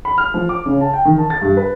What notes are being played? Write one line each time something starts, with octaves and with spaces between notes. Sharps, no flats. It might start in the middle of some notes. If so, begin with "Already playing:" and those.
B5
F6
F3
D6
C#3
A5
G5
D#3
A5
A6
G2
B4